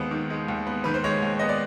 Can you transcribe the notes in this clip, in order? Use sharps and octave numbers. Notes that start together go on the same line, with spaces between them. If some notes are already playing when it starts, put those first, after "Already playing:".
Already playing: D#2 D#3 G#3 B3 C5
D#3
G#3
D#2
B3
D#3 B4
C5
G#3 C#5
D#2
B3 D#5
D5